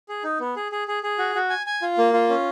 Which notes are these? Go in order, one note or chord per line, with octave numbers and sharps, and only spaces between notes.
G#4
D#4
B3
G#4
G#4
G#4
G#4
F#4
F#4
G#5
G#5
F4
A#3
F4
C#4